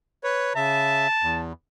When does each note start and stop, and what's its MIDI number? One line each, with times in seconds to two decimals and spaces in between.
0.24 0.53 71
0.24 0.53 73
0.56 1.07 49
0.56 1.07 76
0.56 1.43 81
1.22 1.53 40